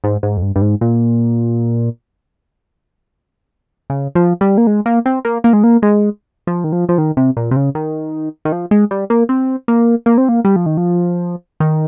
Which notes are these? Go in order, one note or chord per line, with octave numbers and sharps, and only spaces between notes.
G#2
G#2
F2
G2
G2
G#2
A#2
C#3
F3
G3
A#3
G#3
A#3
C4
A#3
A#3
G#3
A#3
G#3
F3
D#3
F3
F3
D#3
C3
A#2
C3
C#3
D#3
D#3
F3
G#3
G3
A#3
C4
A#3
A#3
C4
A#3
G3
F3
D#3
F3
D#3